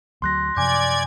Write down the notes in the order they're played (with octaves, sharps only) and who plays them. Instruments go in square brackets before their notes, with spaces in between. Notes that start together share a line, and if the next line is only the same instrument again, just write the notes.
[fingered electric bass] D2 F#3 [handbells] C6 F#6 A#6
[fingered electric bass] F#2 C3 F3 [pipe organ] D5 G#6 [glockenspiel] G#5 D6 G6